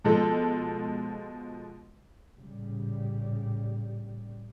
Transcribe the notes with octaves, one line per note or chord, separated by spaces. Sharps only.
B2 F3 G#3 A4
A#1 A2 C#3 G3